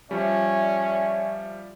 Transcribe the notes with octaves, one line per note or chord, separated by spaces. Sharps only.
F3 G3 C#4 D5 E5